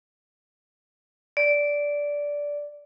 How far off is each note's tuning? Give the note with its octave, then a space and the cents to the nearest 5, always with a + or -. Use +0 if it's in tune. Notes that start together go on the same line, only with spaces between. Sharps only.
D5 -10